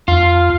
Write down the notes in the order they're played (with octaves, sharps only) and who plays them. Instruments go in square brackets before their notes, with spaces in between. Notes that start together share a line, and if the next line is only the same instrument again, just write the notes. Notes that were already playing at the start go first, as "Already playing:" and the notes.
[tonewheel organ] F2 [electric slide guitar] F4